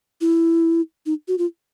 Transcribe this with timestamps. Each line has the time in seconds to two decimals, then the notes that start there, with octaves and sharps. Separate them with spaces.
0.21 E4
1.06 D#4
1.28 F#4
1.38 F4